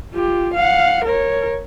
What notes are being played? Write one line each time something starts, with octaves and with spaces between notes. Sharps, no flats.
F4 G4
F5 F#5
A#4 C#5